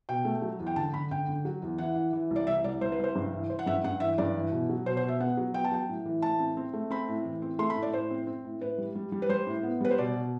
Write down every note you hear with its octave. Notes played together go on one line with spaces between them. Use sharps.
B2 G5
A3
F#3
E2
G5
D3 A5
D3 B5
D3 G5
D3
F#3
E2
E3 F#5
E3
E3
C2
D5
C2 E5
C2 D5
C2 C5
B4
C2 C5
G2
E3
E3 C5
F#5
G2 E5
G2 F#5
E3 E5
G2 D5
E3
B2
F#3
B2 C5
C5
B2 E5
B3 F#5
F#3
B3 G5
A5
F#3 G5
A2
E3
A2 A5
C4
C4
A3
C4 B5
A2
E3
C4
A3 C6
B5
A2
D5
A2 C5
C4
C4
A2
A2 B4
G3
G3
G3
B4
G3 C5
A2
B3
G3 B4
C5
B2 D5
B2